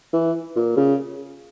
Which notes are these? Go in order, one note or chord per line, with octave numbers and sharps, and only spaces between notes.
E3
A#2
C#3